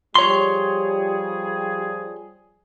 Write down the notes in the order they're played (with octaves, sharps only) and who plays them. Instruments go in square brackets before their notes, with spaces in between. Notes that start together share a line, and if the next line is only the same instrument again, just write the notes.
[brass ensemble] F3 G3 G#4 [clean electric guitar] C#5 C6